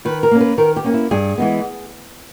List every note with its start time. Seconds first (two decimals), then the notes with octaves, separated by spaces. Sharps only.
0.05 D#3 B4
0.23 A#4
0.31 A#3 C#4
0.41 B4
0.58 D#3 A#4
0.76 G4
0.84 A#3 C#4
0.94 E4
1.11 G2 G#4
1.38 E3 G#3 B3